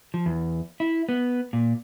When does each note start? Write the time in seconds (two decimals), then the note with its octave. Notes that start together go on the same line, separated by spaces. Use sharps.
0.14 F3
0.26 E2
0.80 E4
1.09 B3
1.53 A#2